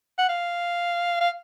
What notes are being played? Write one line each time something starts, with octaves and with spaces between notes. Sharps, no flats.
F#5
F5
F5